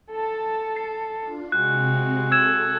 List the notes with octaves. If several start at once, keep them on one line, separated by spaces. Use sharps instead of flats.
A4 A5
C7
D4 F4
C3 G#3 C4 F#4 F#6
A4 A5 E6 G#6 E7